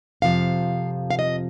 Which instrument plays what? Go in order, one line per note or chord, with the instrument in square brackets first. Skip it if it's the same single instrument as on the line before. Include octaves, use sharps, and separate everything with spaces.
[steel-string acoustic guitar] F2 C3 F3 F5
F5
D#5